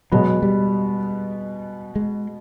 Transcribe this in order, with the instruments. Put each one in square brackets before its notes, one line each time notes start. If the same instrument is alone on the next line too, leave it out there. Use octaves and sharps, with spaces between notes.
[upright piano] B2 G#3 B3 [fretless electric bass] F#3
[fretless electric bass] G3
G#3